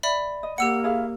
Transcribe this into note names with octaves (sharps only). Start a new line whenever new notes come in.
D5 E5 B5
D#5
A#3 G4 F#5 E6 C#7
E4 G#4 F5